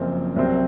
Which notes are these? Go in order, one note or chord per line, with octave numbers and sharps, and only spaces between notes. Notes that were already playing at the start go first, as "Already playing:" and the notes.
Already playing: F#1 F#2 F3 C4
C2 C3 F#3 C4